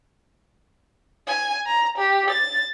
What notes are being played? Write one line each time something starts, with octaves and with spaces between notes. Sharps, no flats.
G#5
A#5
G4
A6